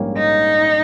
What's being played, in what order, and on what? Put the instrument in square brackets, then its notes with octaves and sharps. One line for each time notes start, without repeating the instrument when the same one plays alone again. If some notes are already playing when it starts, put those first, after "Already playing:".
Already playing: [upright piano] A#1 G#2 G3 A#3 C#4
[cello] D#4